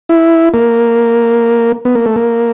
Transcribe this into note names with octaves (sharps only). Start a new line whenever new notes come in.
E4
A#3
B3
A#3
A3
A#3